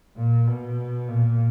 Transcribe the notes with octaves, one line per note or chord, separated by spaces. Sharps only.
A#2
B2
A#2